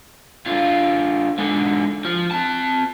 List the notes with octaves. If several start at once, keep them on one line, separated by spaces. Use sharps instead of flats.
D3 F4
G#2 D3
F3
C4 A5